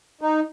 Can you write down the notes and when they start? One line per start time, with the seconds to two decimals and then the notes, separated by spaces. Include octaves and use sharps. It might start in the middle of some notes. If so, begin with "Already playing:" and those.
0.21 D#4